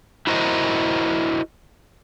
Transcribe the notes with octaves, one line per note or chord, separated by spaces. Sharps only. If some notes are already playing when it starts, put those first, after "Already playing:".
E4 F#4 A#4 C5 D#5